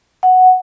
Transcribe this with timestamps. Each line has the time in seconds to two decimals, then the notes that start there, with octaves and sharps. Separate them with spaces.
0.23 F#5